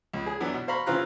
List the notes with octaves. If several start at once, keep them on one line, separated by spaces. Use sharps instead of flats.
C#2
G#4
E3 F#3 B3 D4
B2
C5 F5 A#5 B5 C#6
C#3 E3 C4 F4 A#5 F#6